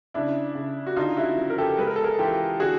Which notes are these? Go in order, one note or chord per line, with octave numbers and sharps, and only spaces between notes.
C#3 D4 E4
C#3
F#4
D3 D#4 F4
E4 F#4
F3
A#4
G4 A4
G#3 B4
A#4
A4
G#4 A#4
E3 F4 G4
D3 F#4 G#4